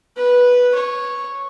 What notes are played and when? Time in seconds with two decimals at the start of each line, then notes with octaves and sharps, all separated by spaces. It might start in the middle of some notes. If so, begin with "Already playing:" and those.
0.17 B4
0.75 C#5